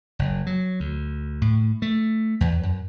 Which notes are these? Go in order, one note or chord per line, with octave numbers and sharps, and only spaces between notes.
F#1
F#3
D2
A2
A3
E2
F#2